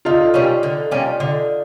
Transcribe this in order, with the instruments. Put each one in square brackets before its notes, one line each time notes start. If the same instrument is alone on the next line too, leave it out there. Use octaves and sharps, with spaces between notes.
[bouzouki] D3 [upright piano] D#4 F4
[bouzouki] G3 A#3 C#4
D3
G3 A#3 C#4
D3